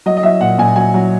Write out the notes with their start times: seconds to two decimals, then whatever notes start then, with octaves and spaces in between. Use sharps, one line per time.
0.06 F#3 D#5
0.17 D#5
0.23 F#3 E5
0.41 A#2 F#5
0.58 A#2 G#5
0.76 F#3 G#5
0.94 F#3